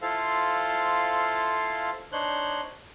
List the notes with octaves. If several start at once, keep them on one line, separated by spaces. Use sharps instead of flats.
E4 F4 A4 C5 F5
D4 D#4 C5 C#5 F#6 G6